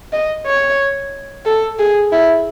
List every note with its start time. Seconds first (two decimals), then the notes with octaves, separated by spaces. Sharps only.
0.13 D#5
0.46 C#5
1.45 A4
1.79 G#4
2.12 E4